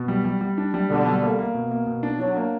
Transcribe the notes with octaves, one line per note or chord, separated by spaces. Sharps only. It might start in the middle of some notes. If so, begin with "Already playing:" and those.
Already playing: B2
G3
G3
G3
D4
G3
B2 D3
G3
A#3
A#3
B2
A#3
B2
D4
F#3 D4
A#3